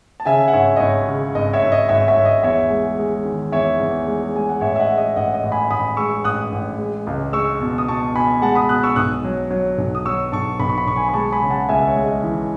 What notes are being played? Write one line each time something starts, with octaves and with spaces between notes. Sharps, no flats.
A5
C#3 E5 G#5
F#5
G#1 C#5 E5
D#5
G#1 C#5
C#3
G#1 D#5
C#5 E5
G#1
D#5
G#1 C#5 E5
C#5 E5
G#1
D#5
E2 C#5 E5
G#3
G#3
D#3
E2 C#5 E5
E2
G#3
G#3 G#5
F#5
A1 C#5 E5
E5
D#5 F#5
G#3
D#5
A1 D#5 F#5
D#5
A1
G#5 B5
A1 B5 D#6
G#3 C#6 E6
A1 D#6 F#6
A1
G#3
C#2
G#3 C#6 E6
B2
D#6
B2 A5 C#6
B2 G#5 B5
G#3 F#5 A5
B5 D#6
B2 D#6 F#6
C#6 E6
B1 D#6 F#6
F#3
F#3
B1
D#6
F#3 C#6 E6
B1 A5 C#6
B1 B5
C#6
B5
B1 C#6
G#5 B5
B5
G#3 A5 C#6
G#5 B5
C#3
F#5 A5
C#2 E5 G#5
C#5
G#3
D#5
E3